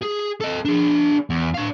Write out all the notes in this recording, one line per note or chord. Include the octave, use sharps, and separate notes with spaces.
G#4
A4 D#5
D4 G#4
E2
D4 F5